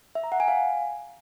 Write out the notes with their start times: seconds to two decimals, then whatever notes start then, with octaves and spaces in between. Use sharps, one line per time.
0.15 E5
0.24 A#5
0.32 F#5
0.40 G#5
0.48 F5